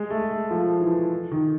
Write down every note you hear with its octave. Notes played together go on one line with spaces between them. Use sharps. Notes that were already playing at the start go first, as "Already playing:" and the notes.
Already playing: G#3
A3
A3
F3
E3
D#3